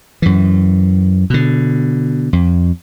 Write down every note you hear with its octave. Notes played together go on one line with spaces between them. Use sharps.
F#2 E3
B2 D3
F2